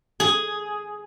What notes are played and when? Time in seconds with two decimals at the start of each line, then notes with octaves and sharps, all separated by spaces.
0.20 G#4